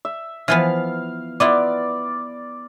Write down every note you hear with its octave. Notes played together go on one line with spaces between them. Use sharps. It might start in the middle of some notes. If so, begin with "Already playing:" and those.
E5
E3 F3 B3 F5
B3 E4 F4 D5